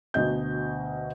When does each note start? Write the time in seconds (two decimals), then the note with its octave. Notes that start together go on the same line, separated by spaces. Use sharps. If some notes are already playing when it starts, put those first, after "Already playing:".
0.14 D2 B2 D#5 G6